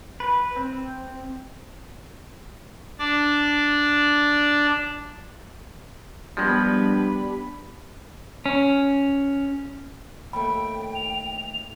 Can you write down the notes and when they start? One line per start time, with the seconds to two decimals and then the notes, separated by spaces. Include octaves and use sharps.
0.20 B4
0.56 C4
2.99 D4 D5 D6
6.37 F3 G3 G#3 B3 D4 B5
8.46 C#4
10.33 D#2 A3 G5 B5
10.95 F7